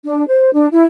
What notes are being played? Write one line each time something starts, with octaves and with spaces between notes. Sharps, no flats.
D4
C5
D4
E4